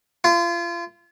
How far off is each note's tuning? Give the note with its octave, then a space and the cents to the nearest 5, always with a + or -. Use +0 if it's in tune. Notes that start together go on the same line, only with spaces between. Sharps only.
F4 -30